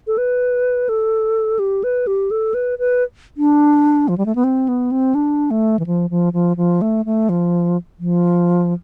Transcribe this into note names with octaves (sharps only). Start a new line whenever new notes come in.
A4
B4
A4
G4
B4
G4
A4
B4
B4
D4
F3
G3
A3
B3
C4
B3
C4
D4
A3
E3
F3
F3
F3
F3
A3
A3
F3
F3